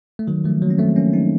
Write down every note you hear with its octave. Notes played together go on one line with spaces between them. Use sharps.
A3
D#3 F#3
F3 A3
F#3 A#3
C#4
A3 C4
A#3 C#4
C4 D#4